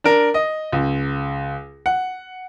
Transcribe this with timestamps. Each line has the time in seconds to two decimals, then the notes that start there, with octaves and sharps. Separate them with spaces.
0.04 D4 A#4
0.34 D#5
0.73 C#2
1.86 F#5